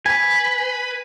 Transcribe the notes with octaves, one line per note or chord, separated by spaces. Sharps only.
B4 G#5